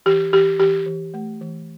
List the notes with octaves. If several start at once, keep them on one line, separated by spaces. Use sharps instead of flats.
E3 G4
E3 G4
E3 G4
E3
A3
E3